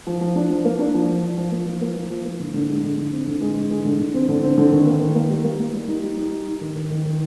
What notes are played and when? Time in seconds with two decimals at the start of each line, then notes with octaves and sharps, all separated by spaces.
0.07 F3
0.21 F3
0.36 D4
0.50 F3
0.65 A#3
0.79 D4
0.94 F3
1.09 F3
1.23 F3
1.38 F3
1.52 A#3
1.67 F3
1.81 A#3
1.96 F3
2.11 F3
2.25 A#3
2.40 D3
2.54 D3
2.68 G#3
2.83 D3
2.97 D3
3.12 C4
3.27 D3
3.41 G#3
3.56 D3
3.70 G#3
3.85 D3
3.99 D3
4.14 C4
4.29 D3
4.43 C4
4.58 D3
4.72 D#3
4.87 A#3
5.01 D#3
5.15 A#3
5.30 G3
5.44 A#3
5.59 A#3
5.73 G3
5.88 D#4
6.03 G3
6.17 D#4
6.32 G3
6.47 D#4
6.61 D#3
6.75 D#3
6.90 D#3
7.05 D#3